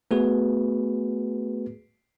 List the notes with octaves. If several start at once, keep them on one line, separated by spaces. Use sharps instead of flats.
A3 B3 F#4 G#4 B4